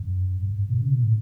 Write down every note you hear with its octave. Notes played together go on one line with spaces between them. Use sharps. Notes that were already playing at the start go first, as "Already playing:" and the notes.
Already playing: F#2
G2
G2
B2
C#3
B2
A2